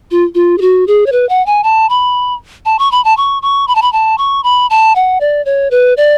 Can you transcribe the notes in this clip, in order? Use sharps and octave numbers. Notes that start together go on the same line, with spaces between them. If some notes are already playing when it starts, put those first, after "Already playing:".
F4
F4
G#4
F#4
G#4
C#5
B4
F#5
G#5
A5
B5
A5
C#6
B5
A5
C#6
C#6
B5
A5
B5
A5
C#6
B5
A5
F#5
D5
C#5
B4
D5